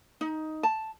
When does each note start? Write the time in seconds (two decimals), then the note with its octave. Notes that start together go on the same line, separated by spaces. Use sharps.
0.21 D#4
0.63 A5